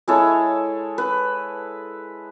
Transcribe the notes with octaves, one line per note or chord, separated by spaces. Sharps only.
G#3 E4 A4 C#5
B4